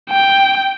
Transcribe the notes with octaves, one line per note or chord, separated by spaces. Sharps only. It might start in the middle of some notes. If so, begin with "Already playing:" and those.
G5